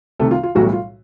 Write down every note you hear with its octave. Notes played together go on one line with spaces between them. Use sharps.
C2 C3 D#3 A3 A4
F4
F4
B1 A2 E3 F#3 G3 F#4
F4